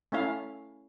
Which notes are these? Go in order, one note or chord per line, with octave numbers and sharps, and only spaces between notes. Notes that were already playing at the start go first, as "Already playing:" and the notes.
A3 C#4 E4 F5